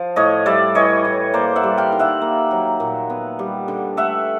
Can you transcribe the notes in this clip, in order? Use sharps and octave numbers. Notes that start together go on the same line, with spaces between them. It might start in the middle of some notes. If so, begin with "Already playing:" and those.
Already playing: F3
A2 C#5 D#5
G3 D5 E5
E3 C#5 D#5
A2
A#3 C5 D5
E5 F#5
G3
F5 G5
D#3
E5 F#5
A#3
F#3
A#2
B3
G3
D3
A3 E5 F#5